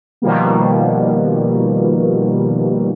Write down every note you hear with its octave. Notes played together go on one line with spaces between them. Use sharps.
B2 D#3 F3 G3 A#3